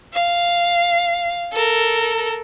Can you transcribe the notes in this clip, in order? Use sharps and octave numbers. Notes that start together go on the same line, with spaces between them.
F5
A4 A#4